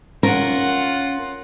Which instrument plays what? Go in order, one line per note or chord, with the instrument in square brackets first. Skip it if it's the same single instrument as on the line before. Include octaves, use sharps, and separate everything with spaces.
[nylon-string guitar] C#4 A#4 [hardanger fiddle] F4 F#5